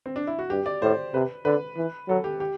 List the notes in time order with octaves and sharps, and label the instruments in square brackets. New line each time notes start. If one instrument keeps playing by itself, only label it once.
[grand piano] C4
D4
E4
F#4
[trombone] G2 [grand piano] G4
[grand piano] D5
[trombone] A2 [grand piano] C5
[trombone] C3 [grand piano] B4
[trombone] D3 [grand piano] B4
[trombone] E3
[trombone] F#3 [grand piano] A4
[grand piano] G4
G4